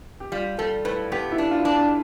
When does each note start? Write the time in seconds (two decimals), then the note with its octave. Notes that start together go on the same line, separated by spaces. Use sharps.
0.20 G4
0.32 G3 F4
0.58 G3 A4
0.85 A2 B4
1.12 B3 G4
1.32 E4
1.38 D4
1.51 F4
1.65 D4